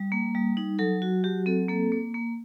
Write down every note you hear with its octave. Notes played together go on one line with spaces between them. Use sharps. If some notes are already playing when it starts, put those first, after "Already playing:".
Already playing: G3
A#3
G3
D#4
F#3 A4
F#4
F#3 G4
C4 A4
A#3 A4
A#3
A#3